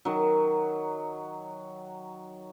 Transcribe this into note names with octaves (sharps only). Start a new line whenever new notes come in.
D#3 F#3